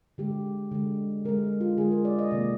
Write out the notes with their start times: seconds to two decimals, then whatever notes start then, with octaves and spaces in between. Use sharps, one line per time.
0.18 D3 G#3 G4
0.71 D3 G#3
1.25 D3 G#3 A#4
1.61 F4
1.78 D3 G#3 G#4
1.92 A#4
2.05 D5
2.19 D#5
2.31 C3 D#3 A#3 D5